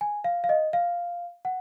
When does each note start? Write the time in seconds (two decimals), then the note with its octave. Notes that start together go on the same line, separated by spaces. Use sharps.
0.01 G#5
0.24 F5
0.44 F5
0.49 D#5
0.73 F5
1.45 F#5